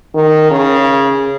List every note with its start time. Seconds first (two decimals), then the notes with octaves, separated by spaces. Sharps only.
0.15 D#3
0.51 C#3